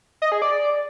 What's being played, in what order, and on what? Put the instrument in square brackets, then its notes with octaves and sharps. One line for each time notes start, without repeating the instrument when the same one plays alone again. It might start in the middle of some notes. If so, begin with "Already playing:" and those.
[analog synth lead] D#5
G#4
D5